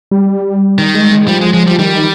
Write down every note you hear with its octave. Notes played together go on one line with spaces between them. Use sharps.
G3
D#3
G#3
G#3
F3 G3
G#3
F3 G#3
G3
D#3 G3